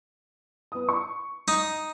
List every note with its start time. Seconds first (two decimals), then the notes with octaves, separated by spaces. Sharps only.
0.72 B3 D#6
0.89 C#6
1.48 D#4